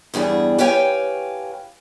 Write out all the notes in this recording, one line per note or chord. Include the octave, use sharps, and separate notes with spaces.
E2 G2 G3 G#4
G4 B4 C#5 F5 G5 G#5